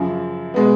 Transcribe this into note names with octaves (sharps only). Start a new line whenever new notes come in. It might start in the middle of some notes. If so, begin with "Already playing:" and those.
Already playing: F#2 C#3 F3
B2 G#3 B3